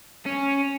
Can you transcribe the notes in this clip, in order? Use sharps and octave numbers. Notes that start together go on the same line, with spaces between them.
C#4